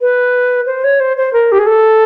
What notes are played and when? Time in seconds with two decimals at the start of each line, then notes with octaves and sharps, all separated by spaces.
0.01 B4
0.66 C5
0.84 C#5
1.00 C5
1.17 C5
1.33 A#4
1.52 G4
1.59 G#4
1.66 A4